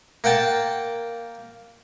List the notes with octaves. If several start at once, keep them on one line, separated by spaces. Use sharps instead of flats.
A#3 F#5 G5 A5